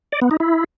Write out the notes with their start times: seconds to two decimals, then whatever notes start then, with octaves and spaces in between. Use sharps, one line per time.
0.12 D5
0.22 B3
0.31 D#4
0.40 E4